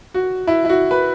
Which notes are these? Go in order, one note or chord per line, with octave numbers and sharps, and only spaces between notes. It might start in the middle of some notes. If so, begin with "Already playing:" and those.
F#4
E4
E4
F#4
B4